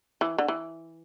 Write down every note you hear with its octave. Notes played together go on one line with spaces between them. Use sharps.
E3
D3
E3